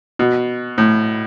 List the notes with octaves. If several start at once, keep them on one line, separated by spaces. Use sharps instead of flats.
B2
A2